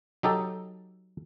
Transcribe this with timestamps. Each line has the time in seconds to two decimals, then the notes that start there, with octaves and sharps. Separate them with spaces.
0.23 F#3 D#4 G4 A4